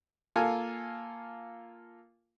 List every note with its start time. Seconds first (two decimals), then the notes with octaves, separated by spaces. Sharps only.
0.36 A#3 F4 A4 G#5